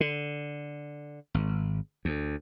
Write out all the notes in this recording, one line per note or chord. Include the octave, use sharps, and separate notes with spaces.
D3
G#1
D2